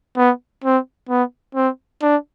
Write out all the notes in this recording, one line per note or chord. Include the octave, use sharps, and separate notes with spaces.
B3
C4
B3
C4
D4